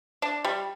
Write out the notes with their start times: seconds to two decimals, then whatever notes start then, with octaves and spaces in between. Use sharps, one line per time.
0.22 D4
0.45 G3